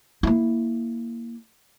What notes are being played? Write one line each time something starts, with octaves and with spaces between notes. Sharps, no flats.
A#3 E4